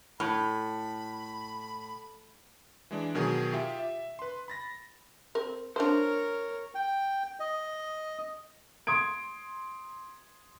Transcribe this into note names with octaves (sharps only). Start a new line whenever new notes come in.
A2 B5
E3 G#3 D4
B2 D#3 F#3 G#4
F4 G4 E5 G5
E5
B4 C6
B5 A6 A#6
C4 A#4
D4 F4 A#4 C5 C#5
G5
D#5
C6 D#6 G#6 D7